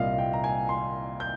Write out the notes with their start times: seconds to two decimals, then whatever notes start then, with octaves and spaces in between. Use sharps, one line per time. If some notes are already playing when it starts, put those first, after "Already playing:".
Already playing: C2 A#2 D#5 F5
0.18 G5
0.33 A#5
0.44 G#5
0.69 C6
1.20 G6